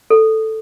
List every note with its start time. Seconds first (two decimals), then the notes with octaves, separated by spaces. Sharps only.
0.10 A4